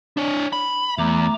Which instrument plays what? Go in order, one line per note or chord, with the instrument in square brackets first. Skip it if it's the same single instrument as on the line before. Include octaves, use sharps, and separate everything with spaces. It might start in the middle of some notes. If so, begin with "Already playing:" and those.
[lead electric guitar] D4 C#5
B5
[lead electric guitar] E2 [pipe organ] A3 A#5 D6